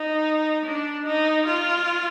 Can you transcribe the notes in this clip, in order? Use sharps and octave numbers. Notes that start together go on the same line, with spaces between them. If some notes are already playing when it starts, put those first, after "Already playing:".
Already playing: D#4
D4
D#4
F4